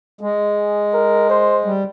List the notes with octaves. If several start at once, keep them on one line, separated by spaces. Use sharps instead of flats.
G#3 G#4
A#4
C5
G3